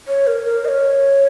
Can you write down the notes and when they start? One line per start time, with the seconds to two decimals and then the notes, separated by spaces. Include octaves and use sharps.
0.08 C#5
0.27 A#4
0.46 A#4
0.65 D#5
0.68 C#5